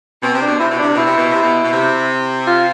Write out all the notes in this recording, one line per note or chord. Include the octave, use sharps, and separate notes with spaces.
B2 C4
C3
D4
B2
C3 E4
B2
C3 D4
B2 E4
C3
B2
C3
B2
B2
C3
F4